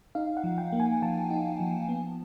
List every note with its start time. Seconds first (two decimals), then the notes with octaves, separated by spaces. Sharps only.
0.15 D#4 F5
0.37 F#5
0.44 F3
0.58 G5
0.72 A#3
0.80 G#5
1.02 F3 A5
1.30 D#4
1.60 F3
1.89 B3